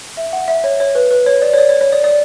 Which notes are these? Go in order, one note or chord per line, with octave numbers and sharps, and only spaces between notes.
E5
F#5
E5
C#5
C#5
B4
B4
C#5
D5
C#5
D5
C#5
C#5
D5
D5